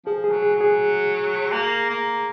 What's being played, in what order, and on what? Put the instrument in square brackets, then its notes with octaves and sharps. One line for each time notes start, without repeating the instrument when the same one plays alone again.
[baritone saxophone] F3 [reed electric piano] G#4
[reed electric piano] G#4
[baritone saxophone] F#3
[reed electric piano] G#4
[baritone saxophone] F#3
[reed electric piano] G#4
[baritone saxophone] A#3
A#3